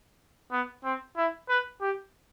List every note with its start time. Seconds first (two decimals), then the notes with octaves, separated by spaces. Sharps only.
0.52 B3
0.84 C4
1.16 E4
1.49 B4
1.81 G4